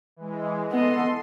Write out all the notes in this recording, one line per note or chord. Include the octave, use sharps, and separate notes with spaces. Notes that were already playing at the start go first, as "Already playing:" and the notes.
E3 G#3
B3 A4 D#5 C6